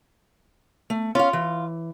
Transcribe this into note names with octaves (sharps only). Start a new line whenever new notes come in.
A3
C#4 F4 F5
E3